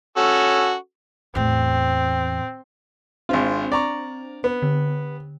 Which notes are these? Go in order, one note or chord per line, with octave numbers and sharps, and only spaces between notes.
C#4 F#4 A4
E2 A2 C4
G#1 C4 D4 F4 C5
D5 A#5 C#6
B3
D3